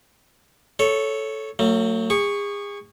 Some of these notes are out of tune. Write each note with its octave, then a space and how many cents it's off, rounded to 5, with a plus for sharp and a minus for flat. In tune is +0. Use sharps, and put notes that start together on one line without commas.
A4 -10 C#5 +0
F#3 +0 A3 +45
G#4 -35 C#6 +0